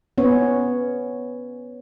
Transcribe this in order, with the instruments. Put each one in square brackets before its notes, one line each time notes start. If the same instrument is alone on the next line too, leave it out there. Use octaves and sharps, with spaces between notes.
[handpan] B3 C#4 C#5